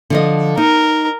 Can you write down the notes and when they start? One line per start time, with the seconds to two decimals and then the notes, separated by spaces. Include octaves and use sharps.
0.10 D3 F3 D#5
0.57 D#4 A#4